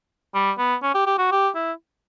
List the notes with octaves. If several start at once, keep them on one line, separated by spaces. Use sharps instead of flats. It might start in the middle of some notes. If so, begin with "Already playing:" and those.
G3
B3
C#4
G4
G4
F#4
G4
E4